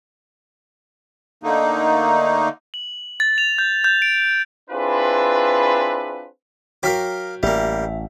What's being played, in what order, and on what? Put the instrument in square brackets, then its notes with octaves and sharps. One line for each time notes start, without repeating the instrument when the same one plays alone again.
[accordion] D3 A3 A#3 D#4
[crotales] F#7
A6
F7
G6
G6
D7
[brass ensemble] C4 D4 E4 F4 G#4 B4
[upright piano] F#3 G5 B6 [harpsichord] A#4 F5 D6
[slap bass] A1 [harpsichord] G3 A#3 [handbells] E5